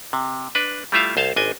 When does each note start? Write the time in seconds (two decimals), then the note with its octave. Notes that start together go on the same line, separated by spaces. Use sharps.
0.13 C3
0.55 D4 B4
0.92 G3 A3 E4 F4 E5 F5
1.17 C2 C5 F5 A5
1.36 G#1 D4 D#5 G#5